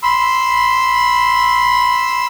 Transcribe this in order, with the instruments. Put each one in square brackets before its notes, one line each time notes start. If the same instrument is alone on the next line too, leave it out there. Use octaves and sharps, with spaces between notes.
[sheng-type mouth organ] B5 C6 E6